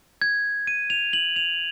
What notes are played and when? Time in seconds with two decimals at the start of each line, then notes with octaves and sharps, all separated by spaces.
0.22 G#6
0.67 D#7
0.90 F7
1.13 F#7
1.36 F7